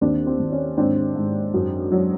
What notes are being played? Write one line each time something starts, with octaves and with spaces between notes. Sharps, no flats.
D#2 C4 D4
C4
D#2
C#4
G#2 C4 D4
G#2
F#2
F#3